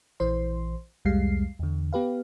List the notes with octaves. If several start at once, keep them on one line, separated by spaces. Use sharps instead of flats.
A#1 E3 C5 C6
C2 F2 G3 G#3 F5 C7
E2 D3
B3 G4 B4 F5